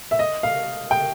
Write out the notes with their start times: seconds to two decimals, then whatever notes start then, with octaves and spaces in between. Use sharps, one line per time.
0.11 E5
0.19 D#5
0.43 F5
0.91 G5